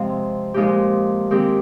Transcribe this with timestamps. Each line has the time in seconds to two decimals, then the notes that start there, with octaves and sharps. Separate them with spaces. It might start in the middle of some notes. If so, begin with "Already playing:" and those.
Already playing: C3 F3 G#3 C4
0.54 A#2 F3 G#3 D#4 G4
1.31 D#3 G#3 C4 G4